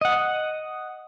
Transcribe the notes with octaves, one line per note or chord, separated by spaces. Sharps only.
D#5 F#5